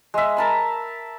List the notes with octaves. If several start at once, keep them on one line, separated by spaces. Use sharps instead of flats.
G#3 E5
A#4 A5 B5